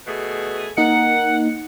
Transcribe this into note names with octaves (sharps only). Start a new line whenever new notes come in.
B2 A3 G#4
A#3 D#4 A#4 F#5